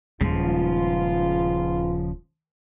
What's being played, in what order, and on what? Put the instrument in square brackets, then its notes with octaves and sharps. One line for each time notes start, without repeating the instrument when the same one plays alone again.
[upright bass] D#1 G#3 [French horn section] G#2 B3 F4 [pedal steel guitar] C#3 F3